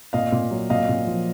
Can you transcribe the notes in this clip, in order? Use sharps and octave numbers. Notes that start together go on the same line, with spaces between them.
A#2 D#5 F5
A#2
F#3
A#2 D#5 F5
A#2
F3